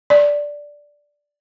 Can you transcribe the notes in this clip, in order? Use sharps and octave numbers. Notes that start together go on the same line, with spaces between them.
D5